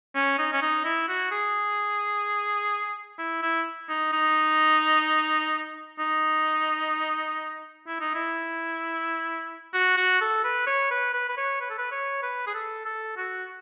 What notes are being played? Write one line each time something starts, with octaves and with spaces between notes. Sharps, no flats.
C#4
D#4
C#4
D#4
E4
F#4
G#4
E4
E4
D#4
D#4
D#4
E4
D#4
E4
F#4
F#4
A4
B4
C#5
B4
B4
B4
C#5
B4
A4
B4
C#5
B4
G#4
A4
A4
F#4